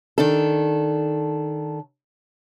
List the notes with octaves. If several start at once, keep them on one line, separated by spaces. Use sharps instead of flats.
D#3 D4 A4